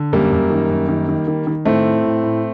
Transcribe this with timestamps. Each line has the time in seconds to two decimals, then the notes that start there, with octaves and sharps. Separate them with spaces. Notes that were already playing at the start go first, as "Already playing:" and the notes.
Already playing: D3
0.12 F#2 G3 A#3
0.32 F#2
0.50 D#3
0.70 F#2
0.89 D#3
1.08 D#3
1.28 D#3
1.47 D#3
1.65 A2 A3 C4
1.85 A2
2.04 A2
2.23 A2